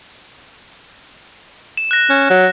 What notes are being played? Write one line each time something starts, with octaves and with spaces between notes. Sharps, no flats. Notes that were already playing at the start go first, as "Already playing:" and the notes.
E7
F#6 A#6
C#4
F#3